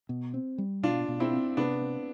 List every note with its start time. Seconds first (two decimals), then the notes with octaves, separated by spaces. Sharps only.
0.09 B2
0.34 C4
0.58 G3
0.83 B2 D4 F4
1.08 B2
1.20 C4 E4
1.33 C4
1.57 C3 B3 D4
1.82 C4